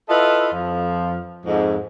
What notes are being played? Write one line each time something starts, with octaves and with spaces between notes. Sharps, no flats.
E4 F4 A4 B4 D#5 E5
F2 F3
F2 G#2